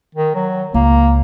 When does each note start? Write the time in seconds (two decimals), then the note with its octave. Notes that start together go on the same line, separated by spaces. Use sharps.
0.15 D#3
0.35 F#3
0.74 C#2 A#3